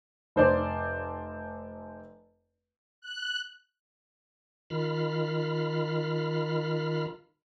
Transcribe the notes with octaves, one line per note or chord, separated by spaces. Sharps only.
F1 C5 D5
F#6
D#3 F4 B5 F6